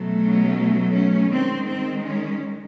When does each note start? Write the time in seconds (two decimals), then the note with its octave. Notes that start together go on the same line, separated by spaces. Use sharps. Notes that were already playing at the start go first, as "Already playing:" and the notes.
Already playing: B2 F#3 A3
0.20 C#4
0.93 C#4
1.31 D#3 G#3 C4
1.67 C4
2.04 C#4